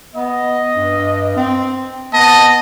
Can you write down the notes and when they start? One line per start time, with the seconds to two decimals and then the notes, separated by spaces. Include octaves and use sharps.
0.16 B3 D#5
0.76 G2
1.36 C4
2.13 B3 D#5 A5